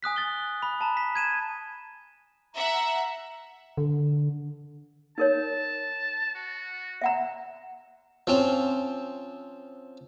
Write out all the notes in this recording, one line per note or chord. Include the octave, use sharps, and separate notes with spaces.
G#5 D#6 F#6 B6
F#6 A6 G7
B5
A5 A#5
B6
G#6 D#7 E7
E5 F#5 A#5
D3
D#4 A#4 C#5 A5
F#4
E5 F#5 A#5
F3 C4 C#4